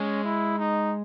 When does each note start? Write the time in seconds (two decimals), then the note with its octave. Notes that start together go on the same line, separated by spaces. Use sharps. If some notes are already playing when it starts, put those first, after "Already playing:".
Already playing: G#3 C#4
0.24 E4
0.58 D#4